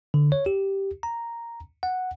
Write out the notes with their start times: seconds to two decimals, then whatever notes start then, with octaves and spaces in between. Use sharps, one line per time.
0.14 D3
0.32 C#5
0.46 G4
1.03 A#5
1.83 F#5